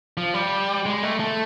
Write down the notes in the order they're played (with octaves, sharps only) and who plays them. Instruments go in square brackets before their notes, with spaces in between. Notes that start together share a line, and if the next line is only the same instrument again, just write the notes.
[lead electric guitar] F3
G3
G#3
A3
A3